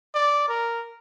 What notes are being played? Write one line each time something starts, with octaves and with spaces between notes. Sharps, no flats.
D5
A#4